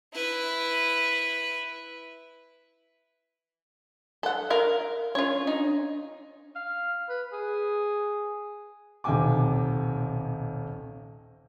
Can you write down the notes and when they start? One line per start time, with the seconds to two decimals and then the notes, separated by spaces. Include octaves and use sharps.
0.13 E4 B4
4.23 A4 F#5
4.50 A#4 F5
5.15 C#4 F4 C#5
5.47 D4 D#4
6.56 F5
7.09 B4
7.32 G#4
9.04 D#1 B1 C3 G5 G#5 D6